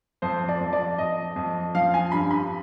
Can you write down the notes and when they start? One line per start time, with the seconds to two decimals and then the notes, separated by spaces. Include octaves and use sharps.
0.22 F2 C5
0.48 D5
0.61 F2
0.73 D5
0.98 F2 D#5
1.36 F2
1.75 F3 F5
1.94 G#5
2.12 G2 B5
2.31 B5